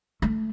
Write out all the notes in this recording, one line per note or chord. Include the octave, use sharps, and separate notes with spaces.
A3